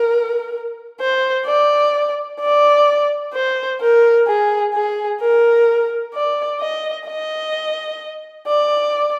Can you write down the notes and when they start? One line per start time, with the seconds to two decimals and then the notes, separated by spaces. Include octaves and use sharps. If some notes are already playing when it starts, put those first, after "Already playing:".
Already playing: A#4
1.01 C5
1.46 D5
2.40 D5
3.34 C5
3.81 A#4
4.27 G#4
4.74 G#4
5.20 A#4
6.14 D5
6.61 D#5
7.07 D#5
8.48 D5